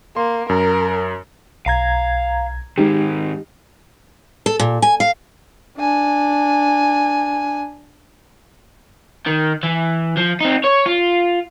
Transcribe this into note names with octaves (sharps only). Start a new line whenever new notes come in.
A#3 C6
F#2 A#4
B1 F5 A#5 G#6
G#2 D#3 G#3 D#4 G4
A4
A#2
G#5
F5
D4 G#5
D#3
E3
F3
C4 D#4
C#5
F4